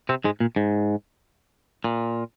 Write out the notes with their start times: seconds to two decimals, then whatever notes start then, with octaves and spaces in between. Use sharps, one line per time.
0.09 C3 C4
0.24 G#2 G#3
0.40 A#2
0.56 G#2
1.84 A#2